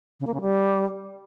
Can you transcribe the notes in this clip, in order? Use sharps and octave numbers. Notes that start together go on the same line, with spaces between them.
C#3
A#3
C#3
G3